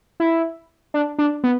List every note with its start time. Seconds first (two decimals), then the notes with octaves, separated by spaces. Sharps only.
0.20 E4
0.94 D4
1.18 D4
1.44 B3